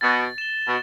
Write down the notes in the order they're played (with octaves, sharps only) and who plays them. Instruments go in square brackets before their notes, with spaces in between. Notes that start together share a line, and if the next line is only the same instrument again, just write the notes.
[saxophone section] B2 [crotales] A6
[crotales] E7 G7
[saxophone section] B2